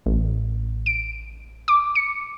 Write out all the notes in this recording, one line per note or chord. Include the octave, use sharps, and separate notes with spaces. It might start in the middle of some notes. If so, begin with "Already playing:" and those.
A1
D7
D6
C#7